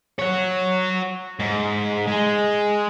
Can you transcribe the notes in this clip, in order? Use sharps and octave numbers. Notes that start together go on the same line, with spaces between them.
C#5 F#5
G#2
G#3